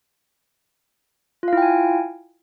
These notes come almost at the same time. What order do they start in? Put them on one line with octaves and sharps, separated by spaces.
F4 F5 E4 G5 G#5